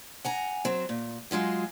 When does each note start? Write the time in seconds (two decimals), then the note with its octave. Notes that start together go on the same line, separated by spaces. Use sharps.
0.25 F#5 G#5 A#5
0.65 F#3 C4
0.89 A#2
1.31 F#3 G#3 F4 G#4